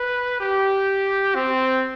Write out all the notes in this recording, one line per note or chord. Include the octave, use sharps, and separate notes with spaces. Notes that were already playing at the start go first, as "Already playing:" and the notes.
Already playing: B4
G4
C4